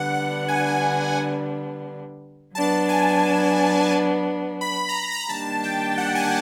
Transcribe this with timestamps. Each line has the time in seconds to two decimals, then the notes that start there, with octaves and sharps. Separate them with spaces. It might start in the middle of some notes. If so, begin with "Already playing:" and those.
Already playing: D3 G3 B3 D4 F#5
0.14 F#5
0.48 G#5
2.54 F#3 B3 D4 A5
2.89 G#5
4.61 B5
4.78 B5
4.89 A#5
4.95 B5
5.12 A#5
5.29 D#3 G3 A#3 D4 G4 A5
5.63 G5
5.98 F#5
6.15 G#5